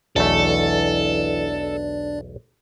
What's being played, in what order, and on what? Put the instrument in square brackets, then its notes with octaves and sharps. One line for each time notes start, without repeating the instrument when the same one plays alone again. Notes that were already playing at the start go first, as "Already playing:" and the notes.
[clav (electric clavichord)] B1 E2 A3 [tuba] E3 [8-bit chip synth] D4 D5 [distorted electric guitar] A4